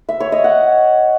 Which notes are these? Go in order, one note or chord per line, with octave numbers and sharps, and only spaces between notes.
E5
C#5
D#5
F#5